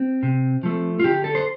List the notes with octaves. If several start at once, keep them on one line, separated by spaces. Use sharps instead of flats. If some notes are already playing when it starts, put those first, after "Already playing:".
Already playing: C4
C3
F3 A3
F4
D3 G4
A4
C5